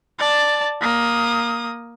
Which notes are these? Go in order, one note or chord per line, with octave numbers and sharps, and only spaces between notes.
D5 A5
A#3 D#6